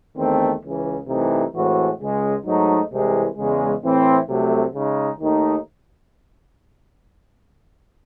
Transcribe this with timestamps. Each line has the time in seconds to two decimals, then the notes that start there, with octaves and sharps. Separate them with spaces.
0.16 E2 D#3 A3 C4
0.61 C#2 C#3 E3
1.07 C2 C3 E3 A3 D#4
1.53 A2 E3 G#3 C4 F#4
1.99 C#2 C#3 G#3
2.45 G#2 F#3 A3 D#4
2.90 C2 C3 E3 G#3
3.36 E2 C#3 G#3
3.82 A2 E3 C4 E4
4.28 C2 C3 F#3 A3
4.73 C#3 G#3 D#4
5.20 D#2 D#3 A3 D#4